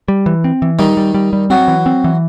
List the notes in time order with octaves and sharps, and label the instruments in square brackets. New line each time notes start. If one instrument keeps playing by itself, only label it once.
[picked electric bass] G3
E3
C4
E3
[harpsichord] D#3 D#4 [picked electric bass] G3
[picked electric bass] G3
G3
G3
[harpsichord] F#3 F#4 [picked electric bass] C4
[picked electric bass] E3
C4
E3